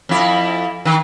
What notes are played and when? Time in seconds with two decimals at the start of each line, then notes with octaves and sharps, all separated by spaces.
0.09 F2 E4
0.85 D#3